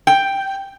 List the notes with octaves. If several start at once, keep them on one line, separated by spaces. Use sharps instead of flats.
G5